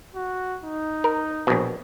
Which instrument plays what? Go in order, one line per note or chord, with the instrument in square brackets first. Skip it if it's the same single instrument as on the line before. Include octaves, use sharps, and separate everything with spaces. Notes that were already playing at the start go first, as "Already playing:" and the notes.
[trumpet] F#4
D#4
[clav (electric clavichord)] A#4
A#1 B2